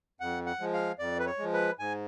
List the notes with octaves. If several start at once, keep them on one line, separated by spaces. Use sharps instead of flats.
F2 F#5
F#5
F3 G#3
F5
F2 D5
B4
C#5
F3 G#3
B4
G#2 G#5